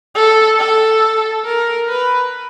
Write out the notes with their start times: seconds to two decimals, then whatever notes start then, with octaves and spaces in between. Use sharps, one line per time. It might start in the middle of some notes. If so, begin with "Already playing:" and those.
0.15 A4
0.59 A4
1.45 A#4
1.88 B4